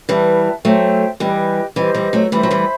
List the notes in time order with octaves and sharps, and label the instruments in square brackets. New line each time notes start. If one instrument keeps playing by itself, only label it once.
[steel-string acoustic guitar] E3 G3 [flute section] B4 E5 A5
[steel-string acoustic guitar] F#3 A3 [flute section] A4 C5 E5 G5
[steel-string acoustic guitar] E3 G3 [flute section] G4 B4 D#5 G5
[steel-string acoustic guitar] E3 G3 [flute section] G4 C5 D#5
[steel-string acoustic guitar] E3 G3
F#3 A3
[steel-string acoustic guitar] E3 G3 [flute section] C5 E5 B5
[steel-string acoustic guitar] F#3
E3 G3